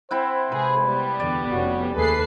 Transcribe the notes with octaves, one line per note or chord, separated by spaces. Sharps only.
C4 E4 C5 F#5
C3 G#3 G#4 B4
G3 B3
E2 D3 D5
F1 C3 C#4 F#4
D#2 A3 G#4 A4 B4 C7